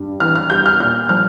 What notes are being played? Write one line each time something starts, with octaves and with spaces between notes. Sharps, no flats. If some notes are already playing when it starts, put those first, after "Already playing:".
Already playing: G2 G3
E3 F6
F6
G3 G6
F6
A#2 F6
F3 F6